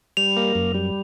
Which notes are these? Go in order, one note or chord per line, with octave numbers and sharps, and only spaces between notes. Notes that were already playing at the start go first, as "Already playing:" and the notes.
G3 F7
A#3
F#2
G3